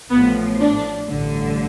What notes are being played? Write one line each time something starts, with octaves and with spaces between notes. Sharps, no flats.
A1 A2 F3 B3
D4
A1 G2 D3